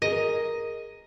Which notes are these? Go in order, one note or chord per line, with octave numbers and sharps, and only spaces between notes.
G#4 A#4 D#5